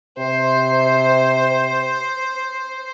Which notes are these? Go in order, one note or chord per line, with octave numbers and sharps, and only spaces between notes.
C3 C5